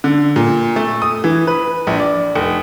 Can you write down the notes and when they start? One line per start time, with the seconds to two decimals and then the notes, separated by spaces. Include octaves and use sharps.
0.04 D3
0.36 A#2
0.76 A3
1.02 D#6
1.24 E3
1.47 B4
1.87 A#1
2.00 D5
2.36 F1